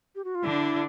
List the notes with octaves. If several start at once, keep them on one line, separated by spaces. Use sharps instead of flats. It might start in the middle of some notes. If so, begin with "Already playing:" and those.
G4
F#4
F4
D3 D4 E4